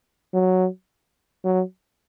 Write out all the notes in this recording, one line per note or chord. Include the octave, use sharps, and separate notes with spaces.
F#3
F#3